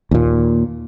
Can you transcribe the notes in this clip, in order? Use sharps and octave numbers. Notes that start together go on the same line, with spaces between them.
D#2 A#2